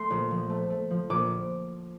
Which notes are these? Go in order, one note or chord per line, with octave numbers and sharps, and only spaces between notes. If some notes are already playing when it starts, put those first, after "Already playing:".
Already playing: A3 C6
A#1
F3
A3
A3
F3
A#1 D6